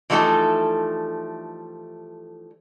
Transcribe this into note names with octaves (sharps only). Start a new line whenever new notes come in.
E3 F3 G3 A3 D#4 A4